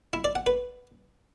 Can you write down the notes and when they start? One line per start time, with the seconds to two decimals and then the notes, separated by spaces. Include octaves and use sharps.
0.13 E4
0.24 D5
0.35 F#5
0.46 B4